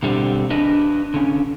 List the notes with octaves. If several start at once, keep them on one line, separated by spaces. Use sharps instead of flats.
B2 D3 G3 C4
D4 B4 D#5
D3 C#4